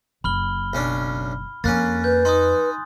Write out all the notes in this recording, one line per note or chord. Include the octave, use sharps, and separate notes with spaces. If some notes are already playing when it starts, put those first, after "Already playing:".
F#1 B5 F6 G7
B1 C#4 D4
F2 A#3 C#4 G#5 F#6 A6
B4 G6
D#4 C6 D#6